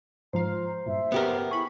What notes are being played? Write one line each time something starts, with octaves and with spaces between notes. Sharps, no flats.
G#2 F3 C5 F5 A#5
G2 A#2 E5
B3 G4 A#4
E4 G#4 B5 C#6